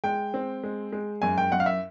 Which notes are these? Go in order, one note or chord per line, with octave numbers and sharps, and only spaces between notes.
G#3 G5
C4
G#3
G#3
F#2 G#5
G5
F#2 F#5
F5
E5